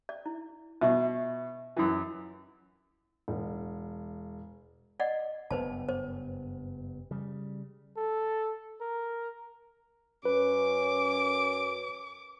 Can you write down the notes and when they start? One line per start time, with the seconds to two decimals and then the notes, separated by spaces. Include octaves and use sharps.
0.09 D5
0.26 E4
0.81 B2 E5 C#6
1.77 F#2 E3
3.28 E1
5.00 D5 D#5 F#5
5.51 F#1 G2 B3 B4 C5 A5
5.89 C5
7.11 C#3 G3
7.97 A4
8.81 A#4
10.25 F#2 C#4 B4 D6